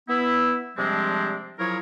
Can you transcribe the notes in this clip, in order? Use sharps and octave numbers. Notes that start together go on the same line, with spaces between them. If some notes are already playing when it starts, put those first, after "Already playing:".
B3 E4
C3 F3 G3 G#3 C4 D4
F3 F#3 E4 G#4 A#4 C#5